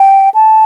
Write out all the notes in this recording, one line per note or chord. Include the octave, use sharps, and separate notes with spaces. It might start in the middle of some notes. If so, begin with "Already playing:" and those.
Already playing: G5
A5